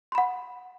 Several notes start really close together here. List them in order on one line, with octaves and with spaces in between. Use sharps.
C6 B5 F#5